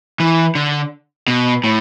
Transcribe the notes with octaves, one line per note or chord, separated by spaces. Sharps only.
E3
D3
B2
A2